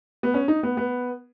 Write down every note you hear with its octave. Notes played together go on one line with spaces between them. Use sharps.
B3
C#4
D#4
B3
B3